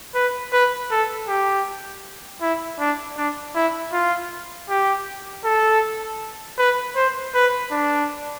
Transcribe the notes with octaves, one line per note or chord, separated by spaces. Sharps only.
B4
B4
A4
G4
E4
D4
D4
E4
F4
G4
A4
B4
C5
B4
D4